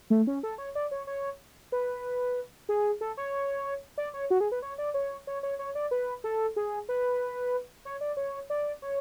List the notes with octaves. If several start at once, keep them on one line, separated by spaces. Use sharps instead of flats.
A3
C#4
A4
C#5
D5
C#5
C#5
B4
G#4
A4
C#5
D5
C#5
F#4
G#4
B4
C#5
D5
C#5
C#5
C#5
C#5
D5
B4
A4
G#4
B4
C#5
D5
C#5
D5
C#5